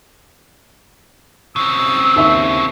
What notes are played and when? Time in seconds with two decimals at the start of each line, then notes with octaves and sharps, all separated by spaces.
1.56 C#3 C4 E6
2.16 D#2 E5 C#6